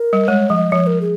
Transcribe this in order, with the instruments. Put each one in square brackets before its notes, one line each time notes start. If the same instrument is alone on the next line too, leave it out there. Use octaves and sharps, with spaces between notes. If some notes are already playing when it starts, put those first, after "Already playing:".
Already playing: [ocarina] A#4
[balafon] G3
[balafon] G#3 [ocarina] C#5
[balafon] F3 [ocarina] D#5
[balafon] F3 [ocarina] C#5
[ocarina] A#4
G#4